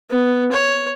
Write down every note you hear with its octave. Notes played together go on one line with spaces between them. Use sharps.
B3
C#5